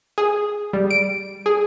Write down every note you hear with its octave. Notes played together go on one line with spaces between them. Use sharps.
G#4
G3
D7
G#4